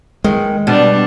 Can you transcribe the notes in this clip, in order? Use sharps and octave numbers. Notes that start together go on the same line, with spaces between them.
D#3 G#3
B2 G3 D4